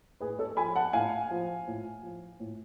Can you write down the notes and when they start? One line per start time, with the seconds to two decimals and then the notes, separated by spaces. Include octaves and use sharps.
0.20 A2 G#4 B4
0.39 A4 C#5
0.57 F3 G#5 B5
0.76 F#5 A5
0.93 A2 F5 G#5
1.31 F3
1.68 A2
2.03 F3
2.40 A2